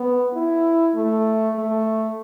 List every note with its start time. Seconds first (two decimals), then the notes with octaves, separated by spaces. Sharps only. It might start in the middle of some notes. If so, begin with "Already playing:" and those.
Already playing: B3
0.33 E4
0.95 A3
1.56 A3